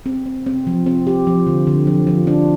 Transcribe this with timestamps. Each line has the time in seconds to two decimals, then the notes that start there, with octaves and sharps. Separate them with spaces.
0.06 C4
0.26 C4
0.46 C4
0.67 F3
0.86 C4
1.07 G4
1.27 F3
1.47 D3
1.67 D3
1.87 F3
2.07 F3
2.27 D4